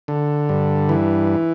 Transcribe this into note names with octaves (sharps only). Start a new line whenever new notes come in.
D3
G2
E3